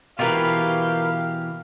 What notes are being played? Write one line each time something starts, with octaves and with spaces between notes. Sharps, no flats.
B2 E3 F4 G4 A#4 B4 F5